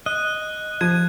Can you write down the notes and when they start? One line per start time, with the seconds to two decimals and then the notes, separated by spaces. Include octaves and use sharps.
0.06 D#5 F#6
0.81 F3 G#6 D#7